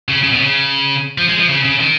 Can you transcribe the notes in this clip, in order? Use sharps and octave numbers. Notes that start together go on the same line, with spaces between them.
C#3
C#3
B2
C#3
F3
G#3
F3
C#3
C#3
D#3